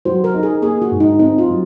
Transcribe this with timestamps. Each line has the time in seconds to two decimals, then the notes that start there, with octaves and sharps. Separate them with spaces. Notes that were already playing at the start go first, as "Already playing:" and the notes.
0.05 F#3 C5
0.24 A#4
0.34 D#4
0.43 G#4
0.62 A#3 G#4
0.82 F#4
0.91 G#2
1.00 D#4
1.19 C4 D#4
1.38 F4
1.48 F#3